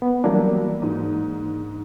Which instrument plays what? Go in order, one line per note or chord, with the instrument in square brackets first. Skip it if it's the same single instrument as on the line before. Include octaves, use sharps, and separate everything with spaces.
[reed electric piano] B3
[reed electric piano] E3 A#3 D4 [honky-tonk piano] F#3 G3
[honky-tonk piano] G#2